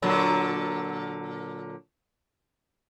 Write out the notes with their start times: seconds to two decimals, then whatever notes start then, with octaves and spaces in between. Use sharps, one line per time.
0.02 A#2 D3 F#3